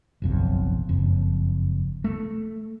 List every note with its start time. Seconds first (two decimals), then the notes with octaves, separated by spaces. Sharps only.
0.22 F#1 B1 F2
0.89 F#1 F2
2.04 A3